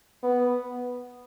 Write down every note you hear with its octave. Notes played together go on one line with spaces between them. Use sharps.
B3